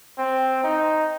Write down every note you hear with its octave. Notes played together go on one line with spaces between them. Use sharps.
C4
D#4